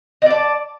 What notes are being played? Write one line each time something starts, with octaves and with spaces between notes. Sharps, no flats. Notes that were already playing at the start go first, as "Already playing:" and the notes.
D5 D#5 A5